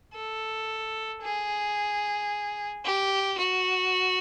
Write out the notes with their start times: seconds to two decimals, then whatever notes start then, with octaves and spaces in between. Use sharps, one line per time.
0.14 A4
1.22 G#4
2.84 G4
3.38 F#4